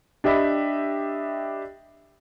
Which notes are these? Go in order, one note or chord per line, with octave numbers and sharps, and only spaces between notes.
D4 G4 D#5 E5 B5